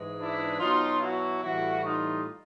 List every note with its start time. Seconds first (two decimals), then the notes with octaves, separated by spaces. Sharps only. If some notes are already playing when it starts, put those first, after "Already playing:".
Already playing: G#2 E3 G#3
0.19 D4 E4
0.59 B2 F#3 D#4 F4
1.01 E4 F#4
1.42 A2 E3 G3 E4 F#4
1.83 D#4 F4